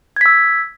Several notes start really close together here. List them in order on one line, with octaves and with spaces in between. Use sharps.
G#6 B6 E6